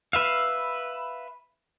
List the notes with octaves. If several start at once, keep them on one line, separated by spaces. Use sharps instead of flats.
B4 E5 F5